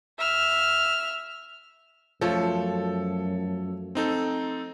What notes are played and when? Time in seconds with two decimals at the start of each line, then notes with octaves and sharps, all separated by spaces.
0.18 E5 F6
2.21 F#2 F3 A3 A4 C#5
3.95 C4 D#4 A4